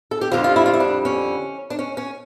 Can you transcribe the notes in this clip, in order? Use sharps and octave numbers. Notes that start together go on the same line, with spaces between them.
A4
G4
F2 D3 G3 F4
F4
E4
F4
E4
D4
C#4
D4
C#4
C#4